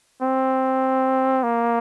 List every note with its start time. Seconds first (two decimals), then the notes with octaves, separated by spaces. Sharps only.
0.22 C4
1.43 A#3